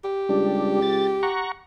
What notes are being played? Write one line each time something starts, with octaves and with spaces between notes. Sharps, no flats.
G4
C#2 G3 D4
A6
F#5 A#5 C#6